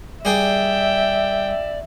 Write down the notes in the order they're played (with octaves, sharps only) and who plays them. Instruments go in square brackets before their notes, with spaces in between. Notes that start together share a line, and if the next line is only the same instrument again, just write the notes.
[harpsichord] G3 G#4 [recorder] D5 [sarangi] E5 [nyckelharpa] G5